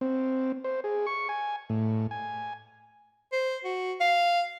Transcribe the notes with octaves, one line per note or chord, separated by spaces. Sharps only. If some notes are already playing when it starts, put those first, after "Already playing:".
C4
C5
G#4
C#6
G#5
A2
G#5
C5
F#4
F5